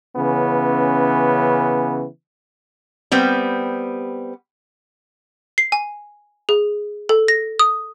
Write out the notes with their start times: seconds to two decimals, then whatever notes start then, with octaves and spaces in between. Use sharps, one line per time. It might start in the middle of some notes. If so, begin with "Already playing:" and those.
0.16 C#3 E3 B3 C#4
3.12 G3 B3 C4
5.58 C7
5.72 G#5
6.49 G#4
7.09 A4
7.28 A#6
7.59 D#6